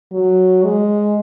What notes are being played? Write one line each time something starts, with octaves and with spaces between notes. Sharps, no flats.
F#3
G#3